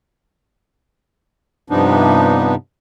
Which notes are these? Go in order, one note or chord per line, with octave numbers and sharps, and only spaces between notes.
G2 C3 F3 B3 D4 D#4